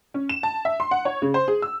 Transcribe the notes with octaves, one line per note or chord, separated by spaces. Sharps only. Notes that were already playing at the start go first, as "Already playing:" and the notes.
C#4
E7
A5
E5
C6
F#5
C#5
C#3
C5
G#4
E6